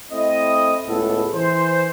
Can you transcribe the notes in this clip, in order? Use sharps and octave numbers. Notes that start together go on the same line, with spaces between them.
A3 C4 E4 D#5
C#2 A2 B3 A4
E3 C5